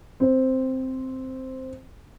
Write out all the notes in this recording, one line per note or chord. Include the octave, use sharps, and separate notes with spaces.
C4 C5